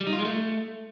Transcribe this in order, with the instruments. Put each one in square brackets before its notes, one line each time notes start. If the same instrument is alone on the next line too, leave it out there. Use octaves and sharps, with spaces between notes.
[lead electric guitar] G3
D#4
F4
G#3
A3